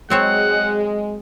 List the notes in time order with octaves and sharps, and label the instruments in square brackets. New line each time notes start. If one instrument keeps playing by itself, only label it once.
[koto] F#3 C4 C#5 [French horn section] G#3 [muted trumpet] F#5